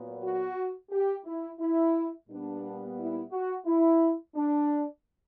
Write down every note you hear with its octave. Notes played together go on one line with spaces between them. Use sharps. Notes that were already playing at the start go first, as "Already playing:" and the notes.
Already playing: A#2 F#3 B3
F#4
G4
E4
E4
A#2 G3 B3 D4
E4
F#4
E4
D4